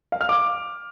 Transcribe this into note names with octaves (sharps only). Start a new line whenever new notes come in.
F5
F6
D6